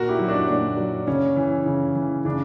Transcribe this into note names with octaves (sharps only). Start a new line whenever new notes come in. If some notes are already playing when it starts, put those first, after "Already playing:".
Already playing: A#2 F#4 A#4
E4 G4
F#3
D4 F#4
A#2 D4
F#3
C#3 C#4
E3
C#3
E3
C#3 D4